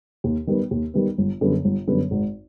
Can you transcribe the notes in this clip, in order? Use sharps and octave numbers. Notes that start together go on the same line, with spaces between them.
D#2
D#3 G3 B3
D#2
D#3 G3 B3
G1
F#2 D3 G3 B3
G1
F#2 D3 G3 B3
G#1